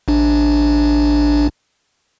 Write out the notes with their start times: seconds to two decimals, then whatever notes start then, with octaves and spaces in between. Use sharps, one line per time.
0.08 A1 D4